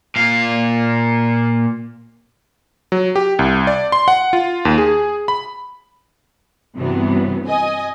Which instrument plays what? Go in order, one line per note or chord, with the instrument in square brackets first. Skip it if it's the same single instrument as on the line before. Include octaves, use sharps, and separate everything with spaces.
[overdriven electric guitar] A#2 F5
[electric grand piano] F#3
G4
C2
D5
C6
F#5
F4
D#2
G#4
B5
[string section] G2 C3 E3 F#3 B3
D#5 G#5